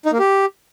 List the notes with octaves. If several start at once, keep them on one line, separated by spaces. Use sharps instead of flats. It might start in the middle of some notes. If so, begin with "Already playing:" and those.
D#4
A#3
G4